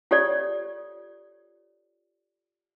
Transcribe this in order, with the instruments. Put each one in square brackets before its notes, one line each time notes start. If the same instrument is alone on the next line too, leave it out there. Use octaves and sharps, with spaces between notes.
[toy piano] F4 G4 A4 C#5 D5